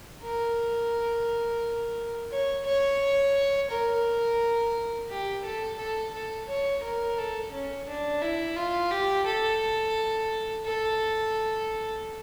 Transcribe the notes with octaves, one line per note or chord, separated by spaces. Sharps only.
A#4
C#5
C#5
A#4
G4
A4
A4
A4
C#5
A#4
A4
C#4
D4
E4
F4
G4
A4
A4